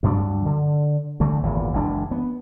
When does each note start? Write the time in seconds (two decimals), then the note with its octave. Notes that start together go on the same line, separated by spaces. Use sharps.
0.03 D2 G2 F#3 D4
0.45 D3
1.20 D3 E3 A3
1.43 G#1 E2 A#2
1.73 F#1 E3 G#3 D4
2.11 B3